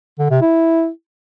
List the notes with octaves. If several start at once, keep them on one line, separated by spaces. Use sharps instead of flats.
D3
C3
E4